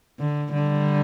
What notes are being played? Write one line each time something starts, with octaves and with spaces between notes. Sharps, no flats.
D3
D3 G3